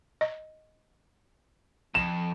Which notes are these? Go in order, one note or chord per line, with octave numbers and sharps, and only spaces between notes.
D#5
F2 E7